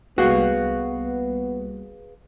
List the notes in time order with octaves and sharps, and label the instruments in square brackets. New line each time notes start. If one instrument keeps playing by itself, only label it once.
[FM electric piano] C2 G3 A#3 [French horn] B3 [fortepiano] F#4 [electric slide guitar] G#4 B4 F5